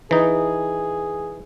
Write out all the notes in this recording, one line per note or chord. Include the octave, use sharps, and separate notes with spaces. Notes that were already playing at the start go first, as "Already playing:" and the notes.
E3 D#4 G#4